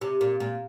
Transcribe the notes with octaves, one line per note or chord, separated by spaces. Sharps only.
C3
A#2
A#2